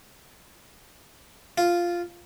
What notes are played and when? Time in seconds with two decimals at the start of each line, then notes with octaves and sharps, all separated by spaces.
1.58 F4